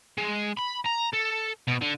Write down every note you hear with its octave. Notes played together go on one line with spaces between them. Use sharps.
G#3
B5
A#5
A4
B2
D3